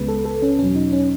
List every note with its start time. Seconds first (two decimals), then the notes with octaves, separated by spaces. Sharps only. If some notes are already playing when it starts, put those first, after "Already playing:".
Already playing: C#2 C#3 G#3 B3 B4
0.08 A4
0.25 A4
0.42 C#4
0.59 E2 B2 F#3 C#4
0.76 D#4
0.92 C#4